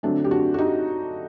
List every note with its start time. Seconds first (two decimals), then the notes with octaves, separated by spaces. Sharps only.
0.03 D3 F#3 A3 C4 D4
0.24 G4
0.31 D4 F#4
0.54 F#4
0.58 D#4 G4